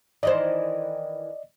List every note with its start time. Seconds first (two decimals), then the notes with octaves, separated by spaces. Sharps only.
0.23 D#3 E3 C5 D5 D#5